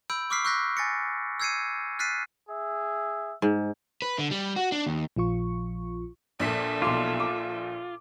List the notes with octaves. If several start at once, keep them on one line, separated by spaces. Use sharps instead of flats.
B5 E6 G6 D7
C#6 D6 E6 F6 B6 C7
C#6 E6 F#6 G6 A#6 B6
G#5 A6 A#6 C#7
E6 G6 G#6 C7 C#7 D#7
F6 F#6 A6 B6 C7 D#7
G#4 E5
G#2
B4
D3
G3
F#4
D4
D#2
A#1 F3 F4 C#6
A#1 A#2 A4 E5 B6
B1 F4 C6 D6
D6